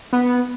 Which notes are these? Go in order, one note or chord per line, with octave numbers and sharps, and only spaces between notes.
B3